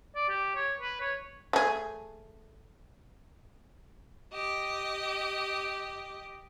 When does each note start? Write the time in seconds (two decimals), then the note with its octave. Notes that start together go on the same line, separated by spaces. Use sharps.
0.15 D5
0.29 G4
0.55 C#5
0.80 B4
1.01 C#5
1.53 A3 G#4
4.32 G4 D#5